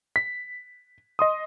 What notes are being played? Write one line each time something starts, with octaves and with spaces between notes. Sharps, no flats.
B6
D#5 C6 D#6